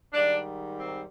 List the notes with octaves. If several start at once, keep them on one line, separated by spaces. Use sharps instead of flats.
G#2 D#3 G3 D4
C4